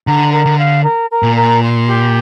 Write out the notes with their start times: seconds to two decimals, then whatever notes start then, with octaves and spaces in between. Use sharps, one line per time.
0.06 D3 A#5
0.32 A#4
0.46 D3
0.58 F5
0.84 A#4
1.10 A#4
1.23 A#2
1.36 A#4
1.62 C6
1.88 G4